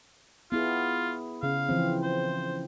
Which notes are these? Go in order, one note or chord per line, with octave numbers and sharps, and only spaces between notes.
B3 E4 F4 G#4
C#3 C#4 F5
E3 F3 C4
C5